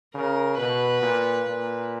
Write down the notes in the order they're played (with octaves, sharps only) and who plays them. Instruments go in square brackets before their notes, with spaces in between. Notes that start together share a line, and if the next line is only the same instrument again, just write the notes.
[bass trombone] C#3 [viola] A#4
[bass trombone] B2 [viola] B4
[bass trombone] A#2
A#2